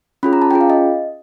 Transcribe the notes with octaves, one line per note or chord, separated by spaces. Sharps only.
C#4 F4 G#4 B5
A#5
A5
C#4 F4 G#4 G5
F5
D#5